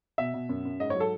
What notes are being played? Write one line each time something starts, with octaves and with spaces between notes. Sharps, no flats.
B2 E5
B2
F#2
F#2
G#2 D#5
F#3 C#5
A4